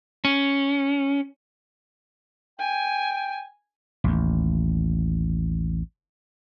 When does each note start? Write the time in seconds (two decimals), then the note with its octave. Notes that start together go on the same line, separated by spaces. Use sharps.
0.25 C#4
2.60 G5 G#5
4.04 A1 D#2